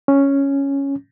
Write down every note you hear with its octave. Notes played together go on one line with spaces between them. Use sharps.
C#4